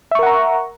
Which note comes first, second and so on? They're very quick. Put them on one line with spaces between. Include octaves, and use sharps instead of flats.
E5 C#6 A#4 F#5 A#5